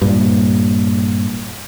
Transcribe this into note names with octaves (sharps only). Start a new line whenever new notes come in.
G2 A#2